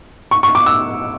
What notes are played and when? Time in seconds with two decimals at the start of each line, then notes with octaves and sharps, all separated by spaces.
0.31 C#6
0.43 C#6
0.55 D6
0.66 E6